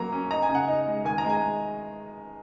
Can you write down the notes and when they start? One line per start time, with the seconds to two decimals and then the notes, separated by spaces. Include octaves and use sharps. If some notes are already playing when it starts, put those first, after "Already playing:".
Already playing: F#3 A#3 A#5
0.12 C#4
0.31 D#4 A#5
0.42 G#5
0.49 C#3
0.55 F#5
0.67 D#4
0.87 G#3
1.05 D#3 G#5
1.18 A#5
1.24 G#3
1.29 G#5